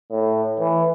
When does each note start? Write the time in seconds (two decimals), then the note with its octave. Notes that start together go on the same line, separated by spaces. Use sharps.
0.11 A2
0.60 E3